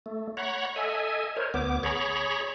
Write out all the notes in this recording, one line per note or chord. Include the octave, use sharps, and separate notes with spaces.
A3
C#5 F#5 A#5 B5 C#6
A4 D#5 E5 G#5
A#4 C5 C#5
D2 B3 D6
G#4 C#5 A#5 B5 C#6